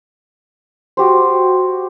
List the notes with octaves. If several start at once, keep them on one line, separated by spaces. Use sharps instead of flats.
F#4 G4 C5